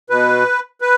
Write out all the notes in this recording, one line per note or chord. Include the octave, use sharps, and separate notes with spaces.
B2 B4
B4